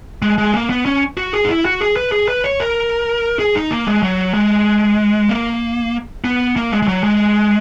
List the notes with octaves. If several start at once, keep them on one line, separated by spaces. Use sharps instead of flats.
G#3
G#3
A#3
B3
C#4
F#4
G#4
D#4
E4
F#4
G#4
B4
G#4
B4
C#5
A#4
G#4
D#4
A#3
G#3
F#3
G#3
A#3
B3
A#3
G#3
G#3
F#3
G#3